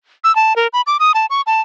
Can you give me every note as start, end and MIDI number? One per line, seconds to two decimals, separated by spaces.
0.24 0.34 88
0.36 0.56 81
0.56 0.67 70
0.73 0.81 83
0.87 0.97 86
0.99 1.12 87
1.14 1.26 81
1.30 1.42 85
1.46 1.61 81